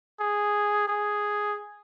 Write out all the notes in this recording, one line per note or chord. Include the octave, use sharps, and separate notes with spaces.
G#4
G#4